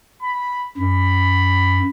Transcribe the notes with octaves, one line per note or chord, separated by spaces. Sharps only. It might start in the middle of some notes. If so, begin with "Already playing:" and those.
B5
F#2 B5